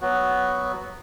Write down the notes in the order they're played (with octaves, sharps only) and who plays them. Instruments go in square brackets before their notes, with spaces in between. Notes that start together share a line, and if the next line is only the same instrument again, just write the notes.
[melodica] F#3 B3 F#4